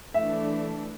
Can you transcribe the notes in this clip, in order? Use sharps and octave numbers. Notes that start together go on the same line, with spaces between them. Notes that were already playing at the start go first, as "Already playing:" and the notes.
E3 A3 D4 E5